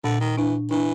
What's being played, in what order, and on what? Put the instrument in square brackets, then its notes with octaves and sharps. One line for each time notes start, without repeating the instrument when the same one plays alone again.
[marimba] A#2 [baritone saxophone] D3
[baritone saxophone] D#3
[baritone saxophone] E3 [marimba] D4
[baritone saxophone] E3 [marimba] D4